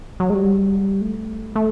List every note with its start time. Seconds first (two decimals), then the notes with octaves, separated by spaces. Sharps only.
0.20 F#3
0.30 G#3
0.34 G3
1.01 A3
1.56 A3